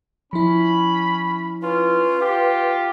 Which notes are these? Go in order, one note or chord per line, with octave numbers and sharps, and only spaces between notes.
F3 C#4 E4 B5
C#4 F4 B4
F4 G4